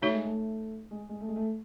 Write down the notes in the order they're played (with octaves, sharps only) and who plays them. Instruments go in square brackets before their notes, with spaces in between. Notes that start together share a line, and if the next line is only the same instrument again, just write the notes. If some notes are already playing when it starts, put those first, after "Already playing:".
[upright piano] A3 [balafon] D#4 F#4 C#5 E5
[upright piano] G#3
A3
G#3
G#3
A3
G#3
A3